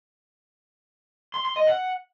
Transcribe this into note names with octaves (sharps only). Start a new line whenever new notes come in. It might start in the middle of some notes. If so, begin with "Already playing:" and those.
C6
C6
D#5
F#5